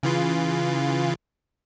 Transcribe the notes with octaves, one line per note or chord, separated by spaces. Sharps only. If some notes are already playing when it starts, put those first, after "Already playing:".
C#3 E3 F4